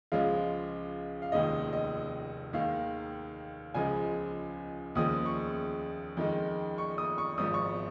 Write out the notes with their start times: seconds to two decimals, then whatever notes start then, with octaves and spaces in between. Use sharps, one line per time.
0.12 C#2 C#3 F3 G#3 F5
1.22 F5
1.32 F1 D#2 D#3 G#3 D#5
1.73 D#5
2.53 D#2 D#3 G#3 F5
3.74 C#2 C#3 F3 G#3 G#5
4.95 D#2 C#3 F3 G#3 D#6
5.26 C#6
6.17 F2 D#3 G#3
6.78 C#6
6.98 D#6
7.18 C#6
7.38 G#1 G#2 F3 D#6
7.54 C#6